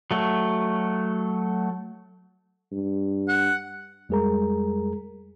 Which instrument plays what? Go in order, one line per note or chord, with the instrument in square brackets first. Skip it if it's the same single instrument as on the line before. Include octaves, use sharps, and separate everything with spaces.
[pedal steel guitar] F#3 A3
[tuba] G2
[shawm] F#5
[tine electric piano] F2 G3 G#3 G#4 A#4 A#5